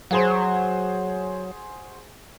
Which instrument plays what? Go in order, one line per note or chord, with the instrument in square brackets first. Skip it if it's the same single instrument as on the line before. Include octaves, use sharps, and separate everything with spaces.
[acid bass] F#3 [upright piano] F#4 G#4 C5